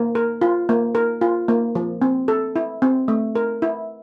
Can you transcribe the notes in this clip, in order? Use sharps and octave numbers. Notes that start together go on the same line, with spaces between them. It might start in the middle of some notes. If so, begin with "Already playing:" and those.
Already playing: A#3
A#4
F4
A#3
A#4
F4
A#3
F3
C4
A4
E4
C4
A3
A#4
E4